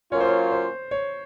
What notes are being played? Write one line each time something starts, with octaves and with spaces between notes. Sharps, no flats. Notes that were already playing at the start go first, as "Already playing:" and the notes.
F#3 A#3 C#4 F4 C#5
C5
C#5
C5
C#5